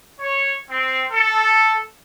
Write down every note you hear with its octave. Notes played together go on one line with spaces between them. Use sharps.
C#5
C4
A4